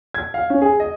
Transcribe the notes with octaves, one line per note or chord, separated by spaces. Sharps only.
G#6
F5
C#4
G#4
D#5